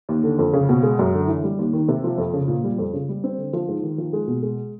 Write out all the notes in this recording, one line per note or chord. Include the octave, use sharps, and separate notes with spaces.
D#2
D3
F2
C#3
B2
G#3
F#2
D3
E3
G3
D#2
D#3
C3
F3
F2
C#3
A#2
G3
F2
C#3
G3
C4
D3
F3
G#2
D#3
F3
G#3
B2
G#3